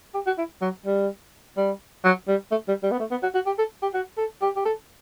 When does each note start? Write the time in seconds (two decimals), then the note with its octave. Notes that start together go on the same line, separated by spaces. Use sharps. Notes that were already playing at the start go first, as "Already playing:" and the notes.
0.14 G4
0.27 F#4
0.38 E4
0.62 F#3
0.86 G3
1.57 G3
2.04 F#3
2.28 G3
2.51 A3
2.68 G3
2.83 G3
2.91 B3
3.00 A3
3.11 B3
3.23 F#4
3.35 F#4
3.46 G4
3.58 A4
3.82 G4
3.94 F#4
4.17 A4
4.42 G4
4.56 G4
4.65 A4